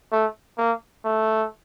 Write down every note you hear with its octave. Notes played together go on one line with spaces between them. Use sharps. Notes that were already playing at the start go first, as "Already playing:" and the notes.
A3
A#3
A3